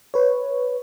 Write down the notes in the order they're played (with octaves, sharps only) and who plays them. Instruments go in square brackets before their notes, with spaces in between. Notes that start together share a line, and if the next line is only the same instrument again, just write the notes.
[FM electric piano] B4 C#5